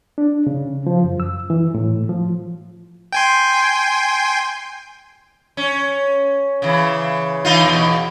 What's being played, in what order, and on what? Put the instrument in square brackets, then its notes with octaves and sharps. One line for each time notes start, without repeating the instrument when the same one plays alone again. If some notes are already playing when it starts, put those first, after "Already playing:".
[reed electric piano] D4
C#3
F3
F#2
E6
E3
A2
F3
[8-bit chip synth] G5 G#5 C6
[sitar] C#4
C#3 E3
E3 D#4 F4
E2 B2